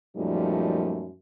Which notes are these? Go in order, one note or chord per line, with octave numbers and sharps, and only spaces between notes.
F#2 A#2 F3 G3 A3 D#4